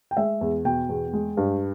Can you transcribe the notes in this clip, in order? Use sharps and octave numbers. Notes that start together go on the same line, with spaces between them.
G5
G#3 E5
E2
B2 G5
E2
G#3
G2